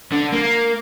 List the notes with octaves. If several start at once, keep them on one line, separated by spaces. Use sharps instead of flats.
D3
A#3